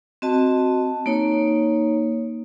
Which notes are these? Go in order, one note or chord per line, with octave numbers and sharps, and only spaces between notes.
C4 F#4 D#5 A5
A#3 D#4 C#5